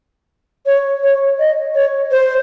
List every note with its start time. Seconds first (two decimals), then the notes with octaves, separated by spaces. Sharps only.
0.66 C#5
1.03 C#5
1.39 D#5
1.75 C#5
2.11 C5